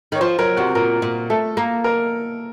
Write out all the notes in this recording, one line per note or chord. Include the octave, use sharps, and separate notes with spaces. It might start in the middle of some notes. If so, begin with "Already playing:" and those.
D#3 C#5
F3 C5
F#3 A#4
C3 F#4
A#2 A#4
A#2
A3 A4
A#3
A#4